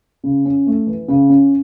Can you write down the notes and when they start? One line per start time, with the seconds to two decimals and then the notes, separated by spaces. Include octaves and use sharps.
0.24 C#3
0.45 C#4
0.67 A3
0.87 E3
1.08 C#3
1.29 C#4